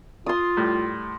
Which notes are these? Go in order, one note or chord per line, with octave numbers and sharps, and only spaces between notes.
F4 C6 D#6
A2 G3